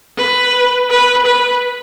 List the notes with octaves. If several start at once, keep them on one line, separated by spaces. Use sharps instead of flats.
B4
B4
B4